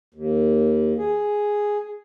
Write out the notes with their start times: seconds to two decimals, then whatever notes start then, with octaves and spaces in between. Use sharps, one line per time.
0.14 D#2
0.98 G#4